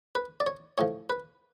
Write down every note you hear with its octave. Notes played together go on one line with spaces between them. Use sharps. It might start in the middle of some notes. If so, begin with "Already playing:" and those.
B4
D5
C#5
A2 F3 C#5
B4